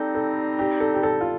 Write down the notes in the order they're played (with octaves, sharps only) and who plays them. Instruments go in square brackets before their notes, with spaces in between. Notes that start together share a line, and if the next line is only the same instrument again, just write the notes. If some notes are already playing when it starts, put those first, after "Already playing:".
Already playing: [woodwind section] G3 C4 D#4 [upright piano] A4
[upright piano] A4
G4
A4
G4
A4
F4